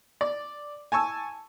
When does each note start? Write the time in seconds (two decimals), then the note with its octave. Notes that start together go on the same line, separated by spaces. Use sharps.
0.21 D5
0.92 G#5 A5 C#6 E6